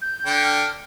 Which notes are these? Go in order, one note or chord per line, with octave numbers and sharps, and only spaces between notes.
G6
D3 G5
F6